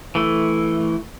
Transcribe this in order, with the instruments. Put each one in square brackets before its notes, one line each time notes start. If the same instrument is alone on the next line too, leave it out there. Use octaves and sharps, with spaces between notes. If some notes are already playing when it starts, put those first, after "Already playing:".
[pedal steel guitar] E3 A3